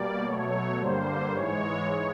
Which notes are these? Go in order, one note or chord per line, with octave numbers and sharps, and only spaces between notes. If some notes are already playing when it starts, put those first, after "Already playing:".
Already playing: B2 G3 A#3 D5
B2 F#3 A3 C#5
G2 D3 G3 A#3 C5
G#2 E3 G#3 C#5